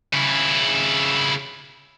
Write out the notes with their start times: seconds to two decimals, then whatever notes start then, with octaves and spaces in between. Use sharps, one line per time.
0.13 C#3 E4